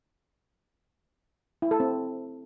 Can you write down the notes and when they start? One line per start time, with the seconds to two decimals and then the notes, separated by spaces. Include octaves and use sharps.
1.62 E4
1.71 A4
1.80 C4